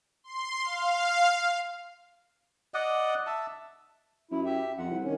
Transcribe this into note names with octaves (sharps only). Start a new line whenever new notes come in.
C6
F5
D5 D#5 F#5
E5 A5
F#2 E4
G4 E5
F2 F#5
C2
D#3 C#4